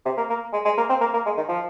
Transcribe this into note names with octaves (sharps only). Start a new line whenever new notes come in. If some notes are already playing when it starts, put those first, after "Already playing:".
C3
A#3
A#3
G#3
G#3
A#3
C4
A#3
A#3
G#3
D#3
F3